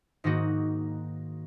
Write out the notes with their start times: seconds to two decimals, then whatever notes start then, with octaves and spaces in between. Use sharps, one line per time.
0.24 G#2 D#3 A#3 D#4 F#4